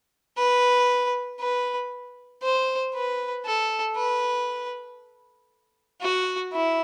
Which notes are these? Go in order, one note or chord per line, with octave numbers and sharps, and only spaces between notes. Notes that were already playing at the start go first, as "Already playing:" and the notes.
B4
B4
C5
B4
A4
B4
F#4
E4